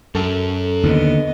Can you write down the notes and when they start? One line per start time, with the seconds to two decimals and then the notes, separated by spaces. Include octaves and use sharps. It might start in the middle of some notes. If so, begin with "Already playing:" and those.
0.15 F#2 A4
0.83 D#2 D3 B3 D#5